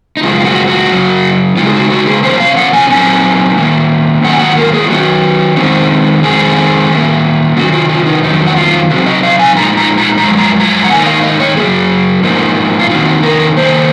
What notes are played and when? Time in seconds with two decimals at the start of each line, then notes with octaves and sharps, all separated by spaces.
0.17 D#4
0.23 F#2 C#3 F3 G#3 F4
0.40 F4
0.46 F#4
0.67 F#4
0.89 F#2 C#3 F#3
1.56 C#3 G#3 D#4 F4
1.65 G#4
1.74 F#4
1.90 F#4
2.07 G#4
2.23 C3 F3 A#3 C#4 C5
2.40 F5
2.57 F#5
2.73 G#5
2.90 A#2 F#3 C4 D#4 G#5
3.57 D#3 A#3 C#4
4.23 G#2 D#3 F#3 A#3 F#5
4.33 G#5
4.39 F#5
4.57 A#4
4.73 G#4
4.86 F4
4.89 D#3 F#3 C#4 F#4
5.56 F2 D#3 G#3 C4 D#4
6.23 F2 D#3 G#3 C4 D#4 G#4
6.90 D#3 A#3 C#4
7.56 C3 D#3 F#3 F#4
7.73 F4
7.90 F4
8.06 D#4
8.23 F2 D#3 F#3 D#4
8.47 F#4
8.56 F4
8.89 C3 F#3 C4 D#4 F#4
9.06 D#5
9.23 F5
9.39 G#5
9.56 A#2 F3 G#3 D#4 A#5
9.77 A#5
9.98 A#5
10.18 A#5
10.23 F#2 C#3 F3 G#3
10.39 A#5
10.60 A#5
10.84 F#5
10.89 G#2 D#3 A#3 D#4 G#5
11.02 D#5
11.06 F5
11.23 D#5
11.40 C#5
11.57 D#3 F#3 G#4
11.61 F#2
12.23 G#2 F3 A#3 D#4
12.79 F4
12.90 F2 C3 D#3 A#3 D#4 F#4
13.23 A#4
13.56 D#3 A#3 C#4 C5